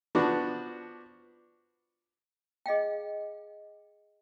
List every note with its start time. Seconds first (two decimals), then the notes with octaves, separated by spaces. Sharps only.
0.15 F3 B3 D4 F#4
2.66 G#4 D#5 F5 G5